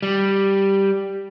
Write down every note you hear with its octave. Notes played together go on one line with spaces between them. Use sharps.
G3